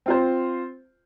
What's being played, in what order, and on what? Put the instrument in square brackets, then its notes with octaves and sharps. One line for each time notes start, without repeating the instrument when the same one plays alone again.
[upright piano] C4 F4 C5